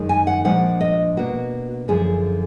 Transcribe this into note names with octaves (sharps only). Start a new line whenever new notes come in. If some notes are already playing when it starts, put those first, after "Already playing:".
Already playing: F#2 D#3 G#3
G#5
F#5
A#2 F3 G#3 D4 F#5
D#5
B2 A#3 D4 F#4
F#2 D3 F3 G#4